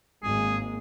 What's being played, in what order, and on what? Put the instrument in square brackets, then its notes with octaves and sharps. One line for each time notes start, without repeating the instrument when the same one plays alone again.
[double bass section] G#1 G#3 A#3 [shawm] G#4